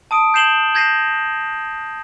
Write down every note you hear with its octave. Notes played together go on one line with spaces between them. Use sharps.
A5 D#6 D7 D#7
G6 C7 E7 F#7 G7
G6 G#6 A#6 C7 D#7 E7